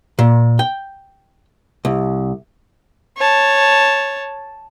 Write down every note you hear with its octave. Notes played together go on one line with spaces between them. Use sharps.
A#2
G5
C2
C#5 A5